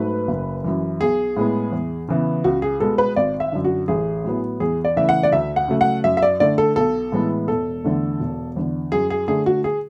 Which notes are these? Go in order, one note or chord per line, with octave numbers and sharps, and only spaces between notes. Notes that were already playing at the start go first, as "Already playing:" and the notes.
Already playing: G#2 F#3 A3 B4
F#1
F#2 E3
B1 G#4
A2 G#3 B3
E2
C#3 E3 B3
C#2 F#4
G#4
B2 G#3 B3 A4
B4
G#1 D5
E5
F#2 D3
F#4
A1 G#4
A2 F#3 B3
E2 G#4
D5
C#3 E3 A3 E5
F#5
D5
D2 E5
F#5
C#3 F#3 A3
F#5
F#2 E5
E5
D5
D3 A3 D5
A4
B1 A4
A2 E3 G#3 B3
E1 A4
E2 D3 A3
E1
E2 D3
F#2 G#4
G#4
D3 A3 G#4
F#4
G#4